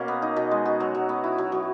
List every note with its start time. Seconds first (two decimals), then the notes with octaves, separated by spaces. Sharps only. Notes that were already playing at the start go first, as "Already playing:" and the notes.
Already playing: B2 A#3 C#4
0.08 B3
0.22 D#4
0.36 B2
0.51 G#3
0.65 F#4
0.80 F#3
0.95 F#3
1.09 B3
1.24 E4
1.38 F#3
1.52 F#3